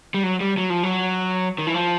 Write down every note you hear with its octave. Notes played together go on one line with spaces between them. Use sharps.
G3
F#3
G3
F#3
F3
F#3
D#3
E3
F3